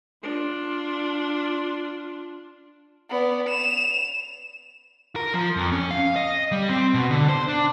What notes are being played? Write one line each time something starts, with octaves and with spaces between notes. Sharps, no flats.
D4 F4
B3 D5
E7 F7
A#4
F3
F2
C#4
F5
D#5
G3
C4
B2
D3
C5
D4